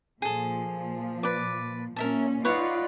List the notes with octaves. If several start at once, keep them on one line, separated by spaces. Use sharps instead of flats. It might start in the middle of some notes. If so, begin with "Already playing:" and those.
A#2 F3 G#4 A4
B4 D5
A#2 C#4 A#4 E5 A5
D#4 F4 B4 C#5 D5 F#5